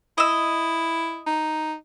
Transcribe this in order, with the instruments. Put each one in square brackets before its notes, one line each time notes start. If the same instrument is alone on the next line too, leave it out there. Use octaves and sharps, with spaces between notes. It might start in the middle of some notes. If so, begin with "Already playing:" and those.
[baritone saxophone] E4 [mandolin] D#5 E6
[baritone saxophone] D#4